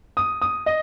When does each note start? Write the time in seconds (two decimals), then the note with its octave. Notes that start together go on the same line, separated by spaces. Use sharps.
0.17 D#6
0.41 D#6
0.66 D#5